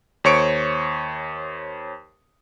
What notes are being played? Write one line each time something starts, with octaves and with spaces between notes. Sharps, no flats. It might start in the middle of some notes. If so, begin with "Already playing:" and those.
D#2 C5 C#5 C#6 C#7 D7